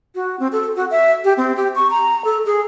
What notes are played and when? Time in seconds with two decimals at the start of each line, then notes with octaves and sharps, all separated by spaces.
0.15 F#4
0.40 C4
0.52 A4
0.76 F#4
0.91 E5
1.24 G4
1.37 C4
1.56 G4
1.75 C#6
1.90 A#5
2.25 A4
2.46 G#4